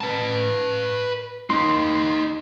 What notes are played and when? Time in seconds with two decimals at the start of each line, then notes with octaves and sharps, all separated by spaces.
0.01 B4 A5
1.50 D#4 G4 C6